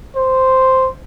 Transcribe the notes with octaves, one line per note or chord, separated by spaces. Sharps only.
C5